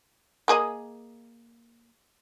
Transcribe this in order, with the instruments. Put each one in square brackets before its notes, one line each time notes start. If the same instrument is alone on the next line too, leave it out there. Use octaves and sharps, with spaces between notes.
[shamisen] A#3 G#4 D#5